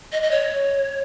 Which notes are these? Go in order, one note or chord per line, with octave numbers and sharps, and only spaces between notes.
D#5
D#5
C#5